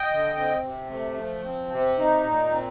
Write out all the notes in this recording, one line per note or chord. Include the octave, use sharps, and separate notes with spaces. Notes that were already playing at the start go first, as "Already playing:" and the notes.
Already playing: D#5 G5
D3
C4
C3
A3
F3
C4
C3
D#4
A#2
C4